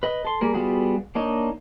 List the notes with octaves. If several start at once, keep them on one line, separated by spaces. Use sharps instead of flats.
B4 D#5
A4 C6
G3 A#3 G#4 A#4
G3 B3 F4 F#4 G#4
A#3 D4 D#4 C#5 D#5